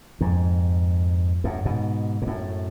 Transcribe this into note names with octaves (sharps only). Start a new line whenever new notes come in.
F2 G#2
F#2 A2
G#2 B2
G#2
F#2 A2